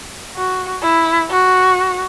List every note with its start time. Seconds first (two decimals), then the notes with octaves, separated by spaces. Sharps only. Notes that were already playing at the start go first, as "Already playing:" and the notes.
0.36 F#4
0.83 E4
1.30 F#4